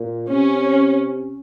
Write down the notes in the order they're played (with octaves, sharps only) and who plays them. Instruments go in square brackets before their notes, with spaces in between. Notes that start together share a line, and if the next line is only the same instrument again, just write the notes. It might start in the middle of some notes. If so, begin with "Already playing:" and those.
Already playing: [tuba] A#2
[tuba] C3 [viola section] C#4